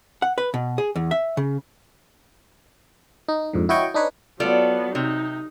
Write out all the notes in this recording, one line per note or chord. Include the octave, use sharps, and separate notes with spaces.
F#5
B4
B2
G#4
E2
E5
C#3
D#4
F2 G#2 D3
E4 F#4 C#5 D#5 G5 C#6
D4 D#4 B4 C#5
F#3 B3 F4 A4 D5
C3 D#4